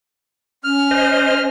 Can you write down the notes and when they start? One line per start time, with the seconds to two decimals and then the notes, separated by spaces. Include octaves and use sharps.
0.64 C#4 F6
0.91 C5 D#5